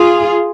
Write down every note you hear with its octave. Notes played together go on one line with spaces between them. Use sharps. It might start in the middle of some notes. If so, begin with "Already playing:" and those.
Already playing: F4 G#4